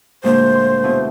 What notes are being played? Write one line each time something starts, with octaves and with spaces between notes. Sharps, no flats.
D2 A#2 G#3 C5
C6
B2 E4 F4